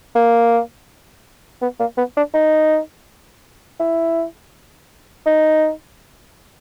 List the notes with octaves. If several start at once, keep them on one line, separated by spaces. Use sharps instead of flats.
A#3
B3
A#3
B3
D4
D#4
E4
D#4